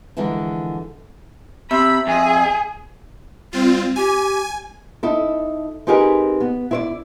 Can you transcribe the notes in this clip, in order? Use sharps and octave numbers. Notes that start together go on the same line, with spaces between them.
D3 E3 F3 G#3 A4 A#4
C3 E5 B5
F2 G#4
G3 C4 F4
G4 G#5
D#4 E4 A4
C4 D#4 G4 G#4 A#4 B4
B3
E4 C5 D5